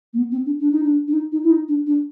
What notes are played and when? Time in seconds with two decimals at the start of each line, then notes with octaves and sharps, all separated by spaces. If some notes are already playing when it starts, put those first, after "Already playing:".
0.13 A#3
0.17 B3
0.31 C4
0.45 D4
0.59 D4
0.71 D#4
0.83 D4
1.07 D4
1.13 D#4
1.32 D#4
1.43 E4
1.50 D#4
1.68 D4
1.86 D4